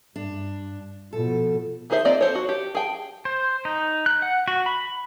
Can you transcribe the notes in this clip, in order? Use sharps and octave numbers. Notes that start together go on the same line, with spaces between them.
G2 D4
B2 F3 A4
D#3 D#4 G#4 C5 E5
A#3 C4 F4 D5 D#5
A4 C5 C#5
F#4
G4
G#4 G5
C5
D#4
F#6
F#5
F#4
B5